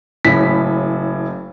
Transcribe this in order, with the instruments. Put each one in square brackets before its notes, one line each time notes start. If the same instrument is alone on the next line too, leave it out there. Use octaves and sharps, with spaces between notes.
[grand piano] F#1 A2 C#3 B6